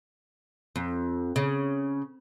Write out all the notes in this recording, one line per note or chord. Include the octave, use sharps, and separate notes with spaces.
F2
C#3